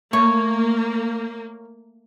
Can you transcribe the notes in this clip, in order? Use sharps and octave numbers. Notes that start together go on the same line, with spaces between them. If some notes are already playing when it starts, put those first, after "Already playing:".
A3 A#3 C#5